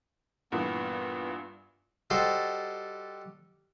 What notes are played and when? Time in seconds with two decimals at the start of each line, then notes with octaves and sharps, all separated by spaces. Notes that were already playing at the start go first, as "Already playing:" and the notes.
0.52 G2 A#2 E3 B3
2.10 G3 F#4 A4 C5 D#5